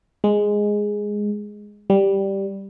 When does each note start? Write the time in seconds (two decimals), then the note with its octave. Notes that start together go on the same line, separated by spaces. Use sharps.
0.24 G#3
1.90 G3